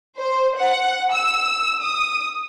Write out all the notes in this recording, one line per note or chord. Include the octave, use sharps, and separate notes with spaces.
C5
F#5
E6
D#6